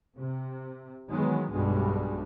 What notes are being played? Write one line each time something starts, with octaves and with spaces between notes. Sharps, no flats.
C3
D#3 E3 F#3 G#3 B3
B1 G2 B2 G3 G#3